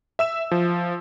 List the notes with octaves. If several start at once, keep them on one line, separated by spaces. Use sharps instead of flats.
E5 E6 E7
F3